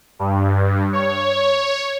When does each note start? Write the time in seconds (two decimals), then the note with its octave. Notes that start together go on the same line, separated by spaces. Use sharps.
0.19 G2
0.93 C#5